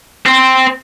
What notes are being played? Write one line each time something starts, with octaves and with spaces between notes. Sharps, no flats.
C4